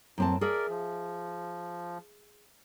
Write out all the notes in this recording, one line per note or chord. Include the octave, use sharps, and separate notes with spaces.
F#2 A2 C4 A5
G#4 A#4 D5 E5
F3